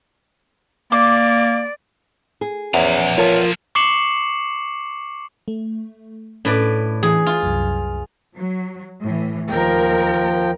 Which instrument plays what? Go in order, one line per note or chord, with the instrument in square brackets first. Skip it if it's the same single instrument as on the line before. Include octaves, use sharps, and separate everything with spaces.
[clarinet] A#3 [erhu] D5 [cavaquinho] D6
[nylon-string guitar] G#4
[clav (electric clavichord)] E2 [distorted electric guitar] F3 A#5 [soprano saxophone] C#4
[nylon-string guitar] F4 A#4 A5 [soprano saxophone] C#5
[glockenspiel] C#6 D6 C7 C#7 E7 F#7
[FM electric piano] A3
[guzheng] A2 B4 D5 [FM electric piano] C#4
[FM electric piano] E3 [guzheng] G#4
[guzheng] F4
[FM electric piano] C2 F#2
[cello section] F#3
A2 E3
[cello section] D#2 A#4 [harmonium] F3 G5